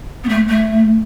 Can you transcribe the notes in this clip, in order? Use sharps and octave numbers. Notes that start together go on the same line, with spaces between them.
B3
A3
A3